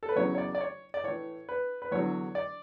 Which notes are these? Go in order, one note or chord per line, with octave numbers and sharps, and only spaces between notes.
A4
B4
E2 C#3 F#3 C#5
C#5
D5
D5
C#5
D5
A2 E3 C#5
B4
B4
E2 D3 F#3 C#5
D5